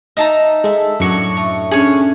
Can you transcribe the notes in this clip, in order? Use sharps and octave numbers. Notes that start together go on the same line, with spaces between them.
D#4 D#5 E5 A5 A#5
G#3 D#4 A4 E5
F#2 A2 F#3 D4 C#6
A3
C#4 D4 G#4 C#5